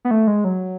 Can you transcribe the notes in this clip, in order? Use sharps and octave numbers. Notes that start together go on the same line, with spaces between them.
B3
A3
G#3
F#3